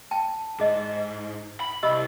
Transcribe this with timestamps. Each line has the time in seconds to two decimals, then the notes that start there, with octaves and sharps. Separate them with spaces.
0.11 G5 A5
0.60 G#2 G#4 D#5
1.60 B5
1.83 C2 G4 D#5 E6